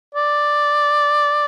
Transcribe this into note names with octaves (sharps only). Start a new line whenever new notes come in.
D5